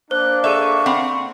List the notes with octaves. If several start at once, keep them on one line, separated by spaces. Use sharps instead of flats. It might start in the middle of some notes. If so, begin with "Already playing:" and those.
A#3 D4 C5 F#6
G#4 A4 D5 E5 C#6
C4 F#5 B5